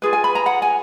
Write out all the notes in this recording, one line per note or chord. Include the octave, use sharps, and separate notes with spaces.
F4 G#4 B4
G#5
B5
A#5
F#5
G#5